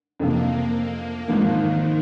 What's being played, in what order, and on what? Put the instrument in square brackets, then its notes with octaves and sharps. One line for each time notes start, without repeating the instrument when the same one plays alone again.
[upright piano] F2 C3 F3 [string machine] A#3
[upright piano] G#1 G#2 F3 A#3 [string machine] D#3